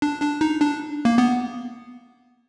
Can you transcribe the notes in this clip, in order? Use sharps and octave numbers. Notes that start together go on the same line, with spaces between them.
D4
D4
D#4
D4
A#3
B3